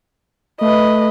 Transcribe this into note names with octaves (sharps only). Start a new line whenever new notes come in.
A3 B4 D#5